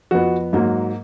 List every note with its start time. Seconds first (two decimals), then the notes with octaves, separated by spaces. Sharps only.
0.11 F2 F3 B3 F#4
0.53 G#2 F#3 A#3